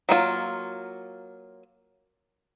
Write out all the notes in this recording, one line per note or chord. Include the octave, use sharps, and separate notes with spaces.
F#3 A#3 F4